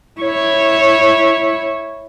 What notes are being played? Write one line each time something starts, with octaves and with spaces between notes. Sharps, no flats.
E4 C#5